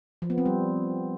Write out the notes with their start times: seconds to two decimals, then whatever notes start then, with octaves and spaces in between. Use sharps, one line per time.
0.22 F3
0.30 B3
0.38 C4
0.46 G3